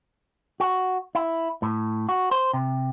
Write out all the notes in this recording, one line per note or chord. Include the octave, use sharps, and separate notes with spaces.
F#4
E4
A2
F#4
C5
C3